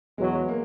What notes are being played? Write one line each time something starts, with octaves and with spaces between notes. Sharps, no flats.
E2 B2 F#3 G#3
A#3